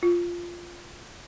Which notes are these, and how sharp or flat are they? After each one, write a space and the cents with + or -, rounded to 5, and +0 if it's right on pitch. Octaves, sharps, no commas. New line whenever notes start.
F4 -5